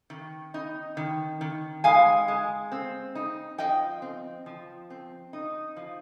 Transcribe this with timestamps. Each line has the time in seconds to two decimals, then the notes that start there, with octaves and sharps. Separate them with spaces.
0.10 D#3
0.54 D#4
0.97 D#3
1.41 D#3
1.84 G#3 F5 G#5
2.28 G#3
2.72 C4
3.15 D#4
3.58 F3 D#5 G5
4.02 C4
4.46 F3
4.90 C4
5.33 D#4
5.76 F3